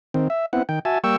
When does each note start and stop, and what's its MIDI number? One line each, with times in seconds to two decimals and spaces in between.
0.14 0.28 51
0.14 0.28 60
0.30 0.46 76
0.53 0.63 59
0.53 0.63 60
0.53 0.63 64
0.53 0.63 78
0.69 0.79 51
0.69 0.79 79
0.85 0.98 66
0.85 0.98 76
0.85 0.98 80
0.85 0.98 81
1.04 1.16 55
1.04 1.16 58
1.04 1.16 79
1.04 1.16 85
1.04 1.16 88